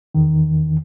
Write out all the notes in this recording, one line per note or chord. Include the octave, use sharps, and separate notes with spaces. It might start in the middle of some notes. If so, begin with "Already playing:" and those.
E2 D#3